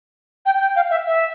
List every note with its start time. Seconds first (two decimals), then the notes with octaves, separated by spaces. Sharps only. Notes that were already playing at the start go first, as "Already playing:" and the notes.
0.46 G5
0.60 G5
0.76 F5
0.90 E5
1.06 E5